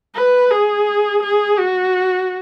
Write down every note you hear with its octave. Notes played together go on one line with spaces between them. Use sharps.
B4
G#4
G#4
F#4